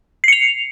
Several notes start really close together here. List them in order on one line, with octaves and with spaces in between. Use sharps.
C7 C#7 F7